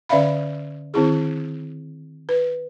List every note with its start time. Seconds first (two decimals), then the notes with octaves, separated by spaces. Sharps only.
0.09 D3 C#4 D5 E5 F5 B5
0.94 D#3 C4 E4 G#4
2.29 B4